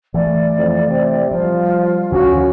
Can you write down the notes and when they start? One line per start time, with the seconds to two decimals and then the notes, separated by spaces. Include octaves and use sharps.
0.14 E3 A3 D5
0.57 F2
0.89 C3
1.31 F3 G3 F4
2.12 D2 D3 E3 C#4 F#4